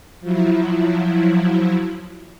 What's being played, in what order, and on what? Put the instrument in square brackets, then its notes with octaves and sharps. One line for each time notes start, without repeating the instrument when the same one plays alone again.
[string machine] F3 F#3 E4